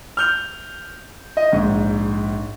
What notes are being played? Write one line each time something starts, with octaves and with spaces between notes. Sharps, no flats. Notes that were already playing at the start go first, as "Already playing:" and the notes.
F6 G6 F7
D#5
A#1 G#2